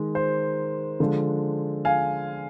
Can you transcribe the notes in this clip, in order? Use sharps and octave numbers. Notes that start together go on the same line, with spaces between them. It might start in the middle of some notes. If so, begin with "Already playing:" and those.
Already playing: D#3 G#3 D#4
C5
D3 F3 G#3 D4
F5 G#5